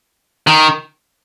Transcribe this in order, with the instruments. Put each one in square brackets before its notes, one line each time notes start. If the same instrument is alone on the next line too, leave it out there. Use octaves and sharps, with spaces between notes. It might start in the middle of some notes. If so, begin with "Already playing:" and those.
[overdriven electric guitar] D#3